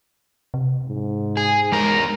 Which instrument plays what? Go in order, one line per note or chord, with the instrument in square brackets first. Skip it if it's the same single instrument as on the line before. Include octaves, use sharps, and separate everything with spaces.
[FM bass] C3
[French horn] G#2
[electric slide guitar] G#4
[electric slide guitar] E2 A#4 [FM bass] G#3